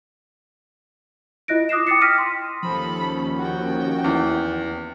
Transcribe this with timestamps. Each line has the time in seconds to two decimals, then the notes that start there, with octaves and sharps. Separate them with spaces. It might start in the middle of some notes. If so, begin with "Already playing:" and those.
1.48 E4 F4 D#5 F#6 A#6 D7
1.69 D6 D#6 F#6 A#6 C7 E7
1.87 G5 D6 D#6 A6 C7 C#7
2.01 D#6 F6 A#6 B6 D#7
2.18 C6
2.63 D#2 D#3 F3 C#4 A4 B5
3.39 F#4 G5
4.04 E2